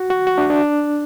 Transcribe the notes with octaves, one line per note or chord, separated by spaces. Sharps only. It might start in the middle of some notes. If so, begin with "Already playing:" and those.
Already playing: F#4
F#4
F#4
D4
D4